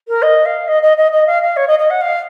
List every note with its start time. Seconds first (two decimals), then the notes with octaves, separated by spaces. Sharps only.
0.08 A#4
0.22 D#5
0.45 F5
0.68 D#5
0.82 D#5
0.97 D#5
1.12 D#5
1.27 F5
1.42 F5
1.56 C#5
1.67 D#5
1.79 D#5
1.90 F#5
2.01 F5